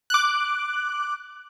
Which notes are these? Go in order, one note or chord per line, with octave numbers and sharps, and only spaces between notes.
D6 F#6